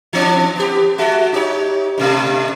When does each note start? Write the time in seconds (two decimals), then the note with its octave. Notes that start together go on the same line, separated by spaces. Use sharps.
0.13 E3 C4 D4
0.56 B3 G4
0.98 G#3 F#4
1.32 D#4 G4 C#5
1.98 G2 B2 A3